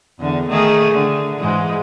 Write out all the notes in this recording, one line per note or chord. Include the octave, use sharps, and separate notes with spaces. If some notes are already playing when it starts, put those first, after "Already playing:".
E2 D3
D#3 A3 G#4
D3
G#2 E3 G#3